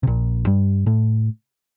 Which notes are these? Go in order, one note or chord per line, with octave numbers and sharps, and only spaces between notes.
C3
A#1 A#2
G2 G3
A2 A3